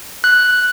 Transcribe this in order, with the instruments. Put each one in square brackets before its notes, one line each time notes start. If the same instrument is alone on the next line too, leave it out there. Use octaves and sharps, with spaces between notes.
[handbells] F#6